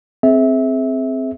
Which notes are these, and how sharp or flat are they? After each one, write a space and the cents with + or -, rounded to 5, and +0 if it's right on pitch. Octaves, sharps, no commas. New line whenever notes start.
C4 +0 G#4 +30 E5 -20